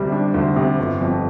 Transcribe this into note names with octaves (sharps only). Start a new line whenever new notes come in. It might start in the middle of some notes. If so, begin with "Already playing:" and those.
Already playing: D2 C3 G3
D4
D2
C3
G1
F2